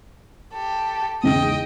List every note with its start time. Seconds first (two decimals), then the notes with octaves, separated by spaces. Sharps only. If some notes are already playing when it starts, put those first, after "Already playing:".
0.53 G4 A4
1.23 E2 G#2 C#3 D#5 G5